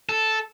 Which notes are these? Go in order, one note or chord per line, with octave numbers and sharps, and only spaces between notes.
A4